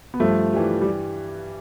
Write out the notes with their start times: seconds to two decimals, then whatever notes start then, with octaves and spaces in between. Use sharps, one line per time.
0.14 B3
0.20 G2 F3 A3
0.53 E3 G3
0.82 G3